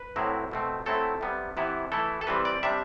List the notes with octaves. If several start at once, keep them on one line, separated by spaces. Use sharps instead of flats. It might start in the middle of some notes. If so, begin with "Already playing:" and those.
Already playing: B4
A2 F#3 C4 E4
B2 A3 C4
F#3 A3 C4 E4 A4
C3 G3 B3
C3 E3 B3 E4
E3 A3 E4 A4
A4
E3 G3 C4 B4
D5
C3 G3 D4 E5